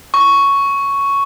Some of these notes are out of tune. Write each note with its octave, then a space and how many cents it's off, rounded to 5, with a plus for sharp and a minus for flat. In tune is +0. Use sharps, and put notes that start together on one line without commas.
C#6 +5